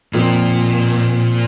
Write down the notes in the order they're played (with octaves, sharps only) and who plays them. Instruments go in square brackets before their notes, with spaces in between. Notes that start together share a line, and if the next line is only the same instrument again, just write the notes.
[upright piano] F2 F3 C4 A#4 [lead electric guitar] A#2